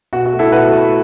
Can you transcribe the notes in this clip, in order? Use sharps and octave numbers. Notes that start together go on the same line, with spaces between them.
B2 F#4
F#4
A3
E4 A4
B2 F#4 B4
A3